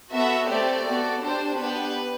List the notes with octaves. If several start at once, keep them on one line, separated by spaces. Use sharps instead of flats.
B3 F#4 A4 E5
A3 C4 G4 D5
B3 F#4 A4
D4 G4 C5
B3 D4 G4 B4